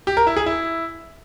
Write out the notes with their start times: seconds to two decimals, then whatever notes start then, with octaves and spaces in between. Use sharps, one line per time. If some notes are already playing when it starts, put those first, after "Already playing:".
0.07 G4
0.17 A#4
0.27 E4
0.37 G#4
0.46 E4